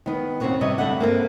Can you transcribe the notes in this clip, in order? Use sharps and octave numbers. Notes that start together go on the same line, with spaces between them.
D#3 B3
D#2 C#3 C4 F#4 C#5 F#5
C3 G3 B4 C#5 D#5
G2 D3 G3 A3 F#5
A#3 C4 A4 B4